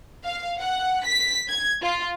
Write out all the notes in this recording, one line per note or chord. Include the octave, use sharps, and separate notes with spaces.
F5
F#5
B6
G#6
F4